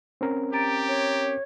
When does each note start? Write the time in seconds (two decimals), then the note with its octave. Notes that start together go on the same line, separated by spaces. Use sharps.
0.21 C4 C#4 A#4
0.53 G4 A#5 A6 D7
0.88 C#5